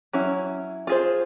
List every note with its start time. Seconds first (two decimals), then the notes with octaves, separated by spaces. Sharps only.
0.13 F#3 C#4 E4
0.87 F4 G#4 C5